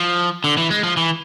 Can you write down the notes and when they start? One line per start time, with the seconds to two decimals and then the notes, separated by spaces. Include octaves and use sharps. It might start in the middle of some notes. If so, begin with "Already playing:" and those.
Already playing: F3
0.44 D3
0.58 E3
0.70 G#3
0.83 F3
0.97 E3